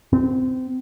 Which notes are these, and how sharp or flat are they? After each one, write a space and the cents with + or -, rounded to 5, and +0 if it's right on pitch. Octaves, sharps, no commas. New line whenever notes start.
C4 -25